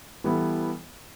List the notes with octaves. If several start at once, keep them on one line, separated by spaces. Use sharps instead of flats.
E3 G3 B3 E4 A4